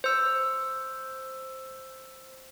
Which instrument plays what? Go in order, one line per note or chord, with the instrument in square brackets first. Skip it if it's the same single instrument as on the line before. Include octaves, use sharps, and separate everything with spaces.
[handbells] C5 E6